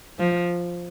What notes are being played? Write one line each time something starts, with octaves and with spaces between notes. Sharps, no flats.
F3